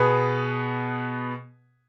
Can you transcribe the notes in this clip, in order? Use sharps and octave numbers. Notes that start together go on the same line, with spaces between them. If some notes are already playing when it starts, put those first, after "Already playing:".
Already playing: B2 B3 G#4 B4